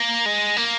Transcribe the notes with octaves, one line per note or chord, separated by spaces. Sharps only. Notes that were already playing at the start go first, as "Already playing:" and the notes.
Already playing: A#3
G#3
A#3